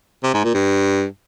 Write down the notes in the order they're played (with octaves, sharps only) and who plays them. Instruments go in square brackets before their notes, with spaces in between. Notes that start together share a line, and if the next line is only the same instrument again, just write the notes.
[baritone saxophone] C3
G#2
A#2
G2